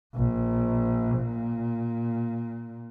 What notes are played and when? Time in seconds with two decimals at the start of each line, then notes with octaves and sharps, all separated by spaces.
0.15 A#1
1.18 A#2